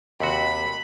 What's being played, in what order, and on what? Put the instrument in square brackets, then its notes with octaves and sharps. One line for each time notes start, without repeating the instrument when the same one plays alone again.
[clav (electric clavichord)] D#2 C3 F#4 [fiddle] B5